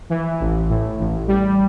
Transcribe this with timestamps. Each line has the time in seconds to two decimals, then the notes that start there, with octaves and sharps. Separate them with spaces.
0.10 E3
0.40 A1
0.69 A2
0.99 A1
1.28 G3